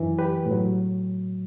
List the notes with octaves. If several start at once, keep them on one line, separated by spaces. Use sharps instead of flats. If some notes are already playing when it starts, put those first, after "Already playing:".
Already playing: F#2 E3
G4 B4
A2
F#3